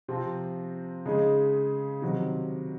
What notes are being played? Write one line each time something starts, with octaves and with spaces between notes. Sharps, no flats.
C3 F3 C4 F4
C#3 G#3 D#4 G#4
C3 D#3 F#3